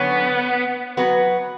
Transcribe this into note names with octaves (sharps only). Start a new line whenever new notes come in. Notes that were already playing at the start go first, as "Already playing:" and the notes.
Already playing: D3 F#3 B3 C#4 C#5
F#3 B3 F#4 B4